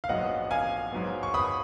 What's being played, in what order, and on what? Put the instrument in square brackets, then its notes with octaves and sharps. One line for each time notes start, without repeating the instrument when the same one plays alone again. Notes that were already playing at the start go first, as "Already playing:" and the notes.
[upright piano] F5
[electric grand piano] A#1 G#2 F#3 B3 [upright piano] D#5 F#5
[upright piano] F5 G#5
[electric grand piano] G#2 F#3 B3
[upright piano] C#6
B5 D#6